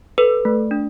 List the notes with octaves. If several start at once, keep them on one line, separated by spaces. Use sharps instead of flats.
A4 B4
A3
D4